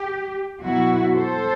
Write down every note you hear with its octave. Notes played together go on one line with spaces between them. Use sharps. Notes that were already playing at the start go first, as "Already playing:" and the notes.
Already playing: G4
B2 F#3 B3 E4 F#4
A4 C5